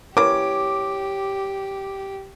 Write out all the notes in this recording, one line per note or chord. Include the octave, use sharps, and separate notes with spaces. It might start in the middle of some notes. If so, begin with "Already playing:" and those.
E3 A#3 G4 C#5 D6